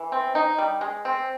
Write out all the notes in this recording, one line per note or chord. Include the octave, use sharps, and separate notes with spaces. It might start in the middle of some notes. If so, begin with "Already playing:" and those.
Already playing: E3
C4
D#4
G3
G#3
C4